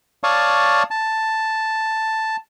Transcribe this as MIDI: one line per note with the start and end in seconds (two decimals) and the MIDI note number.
0.24 0.83 73
0.24 0.83 74
0.24 0.83 77
0.24 0.83 81
0.24 0.83 85
0.24 0.83 87
0.91 2.36 81